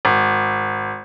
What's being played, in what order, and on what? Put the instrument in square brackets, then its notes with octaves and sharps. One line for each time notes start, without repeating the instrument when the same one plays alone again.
[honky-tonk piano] G#1